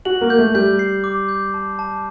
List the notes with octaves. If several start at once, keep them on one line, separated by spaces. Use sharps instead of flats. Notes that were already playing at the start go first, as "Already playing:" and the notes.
F#4 F#7
A#3
G6
A3
G3 G6
C7
D6
G6
A5
A5